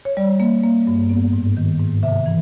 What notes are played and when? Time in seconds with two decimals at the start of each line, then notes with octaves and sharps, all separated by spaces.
0.05 C#5
0.17 G3 D5
0.40 A#3
0.64 A#3
0.87 G2
1.10 B3
1.33 G#2
1.57 D#3
1.80 G#2
2.03 C3 E5
2.26 E3